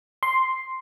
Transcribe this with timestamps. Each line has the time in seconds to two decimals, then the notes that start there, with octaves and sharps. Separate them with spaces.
0.23 C6